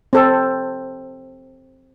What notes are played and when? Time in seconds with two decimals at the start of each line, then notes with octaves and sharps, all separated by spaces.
0.13 C4 A4